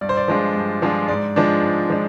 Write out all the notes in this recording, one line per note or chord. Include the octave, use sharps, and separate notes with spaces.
G2 D5
C5
D5
F3 G#3 D4 F4
G2
F3 G#3 D4 F4
G#2 D5
F3 G#3 D4
G#2
F3 G#3 D4